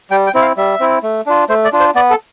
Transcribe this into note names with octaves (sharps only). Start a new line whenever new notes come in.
G3 G5
G5
C4 E4
F5
G3 E5
C4 E4
A3
D4 F4
A3 C5
D5
D4 F4
C5
B3 D5
A4